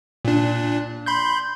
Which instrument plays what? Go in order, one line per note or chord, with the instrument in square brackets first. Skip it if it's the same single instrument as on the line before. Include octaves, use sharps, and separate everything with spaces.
[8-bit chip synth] A#2 D4
B5 C6 G6